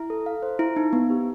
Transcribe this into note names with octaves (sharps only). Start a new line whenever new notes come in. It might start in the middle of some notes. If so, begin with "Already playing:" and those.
Already playing: E4
A4
F5
C5
E4
D#4
B3
G4